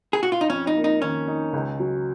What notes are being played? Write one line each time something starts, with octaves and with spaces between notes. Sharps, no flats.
G#4
F#4
F4
D#4
F2 C#4
D#4
A#3
D#4
D#3 C#4
D#4
C#2
F#3